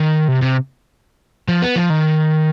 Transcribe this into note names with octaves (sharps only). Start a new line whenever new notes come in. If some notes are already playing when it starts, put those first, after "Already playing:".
Already playing: D#3
C3
C3
F3
B3
F3
D#3